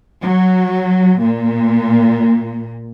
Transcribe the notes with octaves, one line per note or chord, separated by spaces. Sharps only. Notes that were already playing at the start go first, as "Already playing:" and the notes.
F#3
A#2